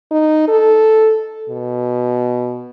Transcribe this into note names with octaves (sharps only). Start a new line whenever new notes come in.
D#4
A4
B2